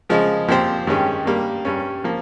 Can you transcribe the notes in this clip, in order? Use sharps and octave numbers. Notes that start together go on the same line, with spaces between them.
C#3 F3 G#3
A#2 F3 C4 G4 C5
G2 D#3 G#3 C#4 G4
G2 G3 A#3
G2 G3 C#4
F3 A#3